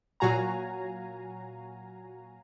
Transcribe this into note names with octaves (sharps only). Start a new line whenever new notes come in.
A#2 F#3 F#4 F5 G#5 A#5